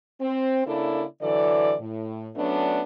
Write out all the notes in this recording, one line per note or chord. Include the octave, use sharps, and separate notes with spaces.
C4
C#3 A#3 D4 E4 A4 D5
D3 E3 F#3 A4 D5
A2
F#3 A3 B3 C#4 D4